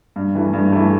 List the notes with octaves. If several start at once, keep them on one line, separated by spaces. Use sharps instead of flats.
G2
E3 A3
G2
E3 A3